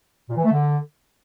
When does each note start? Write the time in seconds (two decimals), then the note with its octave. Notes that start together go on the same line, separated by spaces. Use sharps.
0.29 A#2
0.37 E3
0.44 A3
0.52 D3